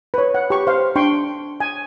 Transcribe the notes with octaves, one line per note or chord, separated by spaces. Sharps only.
B4 C#5
F#5
G4 C#6
C5 F5
D4 G5 C6 C#6
G#5